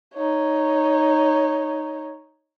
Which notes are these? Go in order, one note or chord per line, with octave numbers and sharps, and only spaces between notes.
D#4 C#5